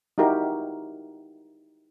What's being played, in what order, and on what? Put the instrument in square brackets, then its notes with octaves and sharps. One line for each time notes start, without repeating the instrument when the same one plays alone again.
[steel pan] D#4 E4 F#4 G4 A#4